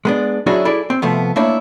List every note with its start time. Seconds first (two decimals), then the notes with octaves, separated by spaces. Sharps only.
0.05 G#3 B3 D4
0.46 F#3 C#4 D4 E4 F#4 G#4
0.65 E4 G#4 A4 D5
0.90 C4
1.02 C3 F3 A3 B3
1.36 A3 A#3 D4 E4 C#5